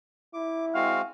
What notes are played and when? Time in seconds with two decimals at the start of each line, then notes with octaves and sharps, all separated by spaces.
0.34 E4 D6
0.75 G#3 C4 F#4 F5